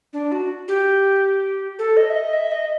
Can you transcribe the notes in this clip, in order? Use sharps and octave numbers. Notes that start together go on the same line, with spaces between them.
D4
F#4
G4
A4
D#5
E5
D#5
E5
D#5